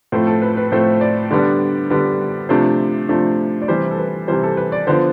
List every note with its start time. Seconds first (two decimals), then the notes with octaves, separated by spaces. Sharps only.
0.12 A2 F3 A3 C4 C5
0.27 A4
0.42 B4
0.57 B4
0.72 A2 F3 A3 C4 C5
1.01 D5
1.31 D3 G3 B3 D4
1.90 D3 G3 B3 D4
2.49 C3 F3 A3 D4 C5
3.09 C3 F3 A3 D4
3.62 D5
3.68 C3 E3 G3 C5
3.91 A4
3.98 B4
4.27 C3 E3 G3 C5
4.43 A4
4.57 B4
4.72 D5
4.87 D3 F3 B3 D4 C5